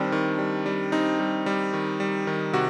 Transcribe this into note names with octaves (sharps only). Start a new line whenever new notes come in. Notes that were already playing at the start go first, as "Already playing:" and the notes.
Already playing: D#3 G3 C4 D4
D#3
G3
G3
C4 D#4
G3
G3
D#3
G3
D#3
C3 F#4